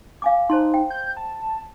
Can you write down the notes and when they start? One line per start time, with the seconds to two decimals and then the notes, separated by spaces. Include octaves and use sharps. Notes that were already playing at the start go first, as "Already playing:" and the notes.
0.22 F5 G#5 D6
0.50 D#4 C5 A5 C6
0.74 G5
0.90 G6
1.17 A5